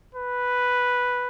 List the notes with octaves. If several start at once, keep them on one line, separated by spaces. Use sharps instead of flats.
B4